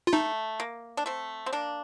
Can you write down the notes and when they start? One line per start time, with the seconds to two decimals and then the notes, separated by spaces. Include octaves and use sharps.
0.07 F4
0.13 A3 D#4
0.60 A#3
0.97 D4
1.06 A3 C4
1.46 C4
1.53 A#3 D4